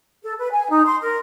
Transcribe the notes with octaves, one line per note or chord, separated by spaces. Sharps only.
A4
B4
G#5
D#4
C6
A#4